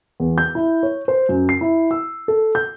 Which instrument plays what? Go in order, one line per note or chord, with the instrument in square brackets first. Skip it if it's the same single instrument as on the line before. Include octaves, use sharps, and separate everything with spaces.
[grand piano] E2
G6
E4
C#5
C5
F#2
C7
E4
E6
A4
G6